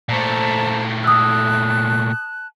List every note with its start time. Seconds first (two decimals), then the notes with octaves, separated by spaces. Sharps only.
0.09 A#2 A3 C5 A5 A#5
1.04 A5 D#6 E6 F#6